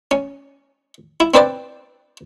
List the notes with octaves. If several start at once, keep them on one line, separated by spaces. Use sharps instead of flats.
C#4
E4
C4 D4 B4 C5 D5